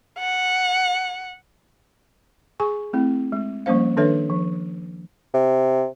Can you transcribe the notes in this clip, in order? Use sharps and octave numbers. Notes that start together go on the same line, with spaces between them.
F#5
G#4 G#5 C#6
A3 C4 E4
G#3
F3 G3 A#3 C#4 C5 F5
D#3 D4 A4 B4 C#5 E5
F3
C3